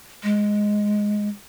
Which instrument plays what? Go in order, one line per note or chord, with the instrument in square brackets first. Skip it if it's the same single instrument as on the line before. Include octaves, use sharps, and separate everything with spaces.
[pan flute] G#3